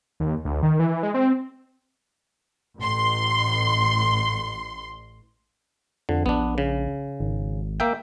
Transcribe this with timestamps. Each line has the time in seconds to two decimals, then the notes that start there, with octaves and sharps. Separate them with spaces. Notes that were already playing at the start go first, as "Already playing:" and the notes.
0.20 D#2
0.45 D2
0.63 D#3
0.79 E3
1.03 G#3
1.14 C4
2.78 A1 C6
6.09 F2 D3
6.26 A#1 B3 D4
6.58 C#3
7.20 G#1
7.80 A#3 E5 G5